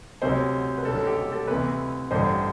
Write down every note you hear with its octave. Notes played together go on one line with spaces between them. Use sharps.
D2 C3 F#3 C5
B4
D2 D3 F#3 A4
A4
G4
G4
A4
D2 C3 E3 B4
A1 G2 D3 C5